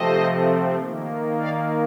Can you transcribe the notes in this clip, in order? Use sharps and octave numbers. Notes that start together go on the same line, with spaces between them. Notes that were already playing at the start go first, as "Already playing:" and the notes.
Already playing: C3 F3 A3 C4 C5 D#5
D#3 A#3
D5 F5